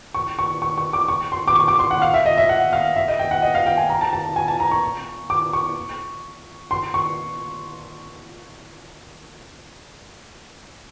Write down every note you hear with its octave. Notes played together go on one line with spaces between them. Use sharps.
C#6
C#6
C#6
C#6
D6
C#6
C6
D6
C#6
D6
C6
F#5
F5
E5
D#5
E5
F#5
F5
E5
D#5
G5
F#5
D#5
F5
G5
G#5
A#5
A5
A5
G#5
A5
A#5
C#6
D6
C#6
C6
C#6